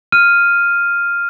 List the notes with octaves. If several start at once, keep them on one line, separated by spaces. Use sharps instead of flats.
F6 D#7